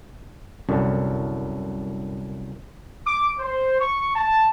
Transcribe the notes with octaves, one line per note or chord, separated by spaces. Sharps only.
C2 F#2 D3
D6
C5
C#6
A5